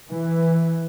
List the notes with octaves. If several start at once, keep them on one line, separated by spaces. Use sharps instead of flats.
E3